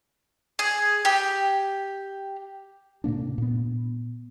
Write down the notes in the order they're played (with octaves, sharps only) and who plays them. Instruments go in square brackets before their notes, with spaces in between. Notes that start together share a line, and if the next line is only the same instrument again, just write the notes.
[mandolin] G#4
G4
[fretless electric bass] A2 C3 A#3 D4
A#2 B3